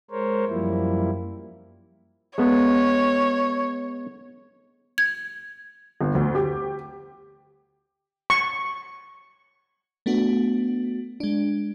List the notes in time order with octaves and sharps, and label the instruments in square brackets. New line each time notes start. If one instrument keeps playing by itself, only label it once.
[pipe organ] G#3 A#4 C5 C#5
F#2 F3 G3 A#3 E4
[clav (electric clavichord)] G#3 B3 [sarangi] C#5
[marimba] G#6
[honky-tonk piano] G1
D2
G4
[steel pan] C#6
[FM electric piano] A3 B3 D4 F#4
G#3 D4